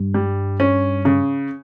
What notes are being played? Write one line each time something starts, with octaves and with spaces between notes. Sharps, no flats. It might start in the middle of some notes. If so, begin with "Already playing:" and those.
Already playing: G2
G3
C#4
C#3